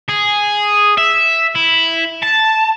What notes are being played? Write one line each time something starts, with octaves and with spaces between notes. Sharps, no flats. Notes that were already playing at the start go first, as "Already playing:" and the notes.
G#4
E5
E4
A5